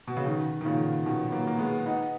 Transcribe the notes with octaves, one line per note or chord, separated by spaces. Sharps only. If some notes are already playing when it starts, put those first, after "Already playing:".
B2
C#3
B2 D#3
D#3
A#2 C#3
B2 D#3
B3
F#3 A#3
A#3
G#3 B3
B3 D#4